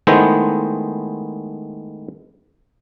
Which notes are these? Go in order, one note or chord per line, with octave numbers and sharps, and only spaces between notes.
D#3 G#3 A3 B3 E4 C5